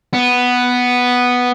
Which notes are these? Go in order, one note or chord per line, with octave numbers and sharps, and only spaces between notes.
B3